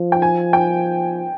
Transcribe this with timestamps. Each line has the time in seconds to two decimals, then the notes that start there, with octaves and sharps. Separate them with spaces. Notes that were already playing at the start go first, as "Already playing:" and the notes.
Already playing: F3
0.12 G5
0.22 G#5
0.53 G5